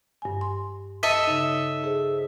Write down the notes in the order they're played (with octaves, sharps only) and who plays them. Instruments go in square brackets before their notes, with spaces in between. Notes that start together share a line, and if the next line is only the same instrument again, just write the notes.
[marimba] G2 G#5
C6
[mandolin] A4 D#5 E5
[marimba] C#3 D#4
G#4 C5